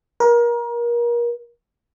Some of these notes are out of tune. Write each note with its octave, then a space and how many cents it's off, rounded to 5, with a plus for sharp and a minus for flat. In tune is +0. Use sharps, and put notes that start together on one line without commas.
A#4 +30